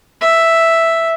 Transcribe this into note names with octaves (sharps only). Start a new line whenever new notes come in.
E5